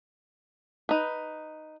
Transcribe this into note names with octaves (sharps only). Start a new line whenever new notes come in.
D#4 B4